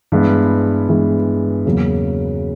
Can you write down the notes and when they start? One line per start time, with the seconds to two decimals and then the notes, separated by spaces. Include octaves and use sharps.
0.12 G2 E3 G#3 B3
0.89 G2 E3 G#3 B3
1.65 E2 C#3 F#3 A#3 C#4